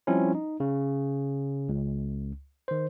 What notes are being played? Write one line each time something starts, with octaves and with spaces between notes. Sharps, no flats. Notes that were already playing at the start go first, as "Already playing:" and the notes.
F3 G3 C4 C#4 E4
D#4
C#3
C#2
D#3 C5